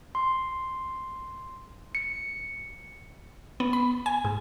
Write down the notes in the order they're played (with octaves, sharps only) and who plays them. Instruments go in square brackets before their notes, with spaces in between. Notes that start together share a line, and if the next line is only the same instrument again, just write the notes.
[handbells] C6
C#7
[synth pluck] B3
B5
G#5
G#2